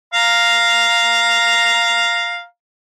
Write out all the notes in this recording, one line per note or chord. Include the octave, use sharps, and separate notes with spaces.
F5 A#5